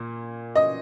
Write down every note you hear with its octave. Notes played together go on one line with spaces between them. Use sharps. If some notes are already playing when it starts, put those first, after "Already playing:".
Already playing: A#2 A#3
D#5